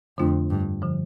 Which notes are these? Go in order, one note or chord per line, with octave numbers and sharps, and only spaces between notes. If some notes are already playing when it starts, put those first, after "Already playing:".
F2 D3 A3 D4 F4
G2
D3 F3